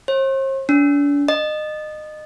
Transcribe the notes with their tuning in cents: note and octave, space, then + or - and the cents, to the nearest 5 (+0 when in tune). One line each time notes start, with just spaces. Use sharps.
C5 +45
D4 -40
D#5 -25